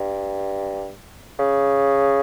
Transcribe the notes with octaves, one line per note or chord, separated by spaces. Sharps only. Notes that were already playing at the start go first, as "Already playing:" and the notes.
Already playing: G2
C#3